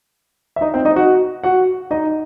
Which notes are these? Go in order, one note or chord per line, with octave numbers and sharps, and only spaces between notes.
E5
D#4 D#5
C4 C5
D#4 D#5
F#4 F#5
F#4 F#5
D#4 D#5